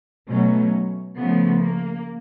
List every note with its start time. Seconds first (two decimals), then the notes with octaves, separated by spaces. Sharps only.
0.28 B2 F#3 A3 C#4
1.17 C#3 F3 A3 B3
1.61 A#3